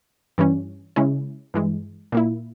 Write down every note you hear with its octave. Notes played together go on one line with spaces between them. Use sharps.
G2 E3 G3 C#4
C#3 G#3 C#4 E4
G2 E3 G#3
A#2 A#3 E4